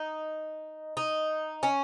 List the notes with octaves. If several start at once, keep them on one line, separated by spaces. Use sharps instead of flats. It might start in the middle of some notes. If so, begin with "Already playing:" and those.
Already playing: D#4
D#4
C#4